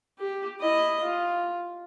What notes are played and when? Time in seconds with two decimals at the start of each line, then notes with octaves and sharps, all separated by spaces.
0.19 G4
0.61 E4 D#5
1.03 F4